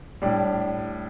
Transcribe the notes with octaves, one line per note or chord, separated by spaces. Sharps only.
A2 G3 D4